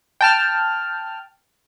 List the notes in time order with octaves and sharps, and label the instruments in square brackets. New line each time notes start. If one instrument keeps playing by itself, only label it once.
[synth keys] G5 A5 F6